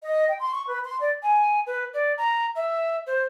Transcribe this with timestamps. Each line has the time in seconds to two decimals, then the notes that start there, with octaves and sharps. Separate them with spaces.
0.03 D#5
0.28 G5
0.40 C6
0.54 C#6
0.68 B4
0.85 C6
1.01 D5
1.23 G#5
1.67 B4
1.94 D5
2.18 A#5
2.55 E5
3.07 C5